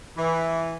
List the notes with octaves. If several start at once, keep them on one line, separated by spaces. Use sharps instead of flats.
E3